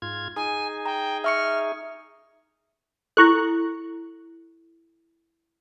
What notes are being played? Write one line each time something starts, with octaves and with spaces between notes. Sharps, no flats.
G#2 F4 G#6
D#4 G#4 G#5
G5 A#5
E5 C#6 F6 C#7
E4 A4 A#5 C#6 F#6